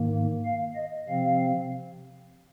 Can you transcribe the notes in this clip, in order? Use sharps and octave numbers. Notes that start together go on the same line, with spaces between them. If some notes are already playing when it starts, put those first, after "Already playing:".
Already playing: G#2 D#3 A#3
F5
D#5
C3 F3 C4 F5